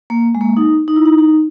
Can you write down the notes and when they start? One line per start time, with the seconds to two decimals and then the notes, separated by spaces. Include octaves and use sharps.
0.10 A#3
0.35 G#3
0.41 A#3
0.57 D#4
0.88 D#4
0.96 E4
1.05 D#4
1.18 D#4